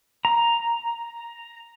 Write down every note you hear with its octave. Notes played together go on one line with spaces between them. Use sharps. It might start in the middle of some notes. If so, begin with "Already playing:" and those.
A#5